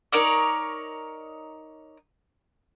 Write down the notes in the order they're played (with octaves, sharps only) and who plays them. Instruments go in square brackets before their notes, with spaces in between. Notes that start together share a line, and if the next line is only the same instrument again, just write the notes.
[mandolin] D#4 A#4 C#5 D5